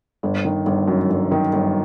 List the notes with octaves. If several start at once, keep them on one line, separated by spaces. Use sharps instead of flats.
G1
D#3
G1
F#2
G1
D#3
G1